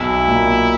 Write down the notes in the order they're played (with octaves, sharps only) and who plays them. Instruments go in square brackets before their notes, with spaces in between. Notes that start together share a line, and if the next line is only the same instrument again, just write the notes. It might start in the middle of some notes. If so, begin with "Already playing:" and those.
Already playing: [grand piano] B1 [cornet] E4
[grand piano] A#2 A#3